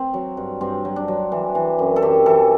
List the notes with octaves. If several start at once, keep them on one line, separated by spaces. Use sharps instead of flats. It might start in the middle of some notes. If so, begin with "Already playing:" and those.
Already playing: C4
F#3
G2
G2 C4
F#3
D4
F#3
E3
E3
F#2
A4
F#2 G4
E3 A4